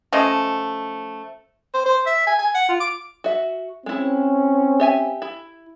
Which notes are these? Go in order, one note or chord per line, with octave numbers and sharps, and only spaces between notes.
F3 A3 C#4 D#5
C5
C5
E5
G#5
G#5
F#5
F4
D6
F#4 E5
G#3 C4 C#4 E4
G4 E5 G#5
E4